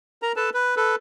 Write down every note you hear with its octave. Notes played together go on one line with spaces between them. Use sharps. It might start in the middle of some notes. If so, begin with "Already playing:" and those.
A#4 A#5
A4 B4 A5
B4
A4 B4